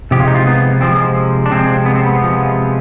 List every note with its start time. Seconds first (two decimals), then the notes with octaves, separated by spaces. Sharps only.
0.11 C3 F3 G#3 G4
0.20 F4
0.27 D#4
0.35 F4
0.47 B3
0.81 C3 F3 G#3 C4
1.46 D4
1.51 C3 F3 G#3 C4
1.86 B3
1.95 C4
2.03 B3
2.21 C3 F3 G#3